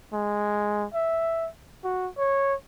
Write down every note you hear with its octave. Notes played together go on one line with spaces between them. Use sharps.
G#3
E5
F#4
C#5